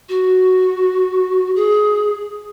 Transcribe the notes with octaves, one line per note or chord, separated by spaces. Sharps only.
F#4
G#4